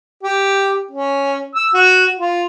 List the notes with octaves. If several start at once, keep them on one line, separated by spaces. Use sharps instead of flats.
G4
C#4
E6
F#4
F4